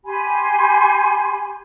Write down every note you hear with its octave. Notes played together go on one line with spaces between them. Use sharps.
G4 G#5 B5 C6